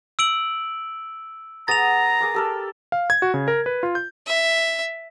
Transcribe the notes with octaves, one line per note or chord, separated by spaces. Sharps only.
E6 D7 F#7
B3 G#4 A#5 D#6 A6 F7
G#4 A#4 D6
G4 A4 A#4
F5
G#6
F#4
C#3
A#4
B4
F4
G6
E5